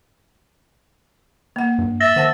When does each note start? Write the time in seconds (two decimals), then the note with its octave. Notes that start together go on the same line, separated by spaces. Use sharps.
1.56 A#3 F#5
1.79 G2
2.00 E5 E6 A6 A#6
2.16 D#3 C5 F#5 A5